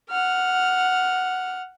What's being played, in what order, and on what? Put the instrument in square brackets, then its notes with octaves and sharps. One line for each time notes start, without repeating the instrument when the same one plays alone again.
[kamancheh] F#5 F6